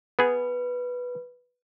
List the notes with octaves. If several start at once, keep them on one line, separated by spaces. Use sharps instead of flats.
B3 G#4 B4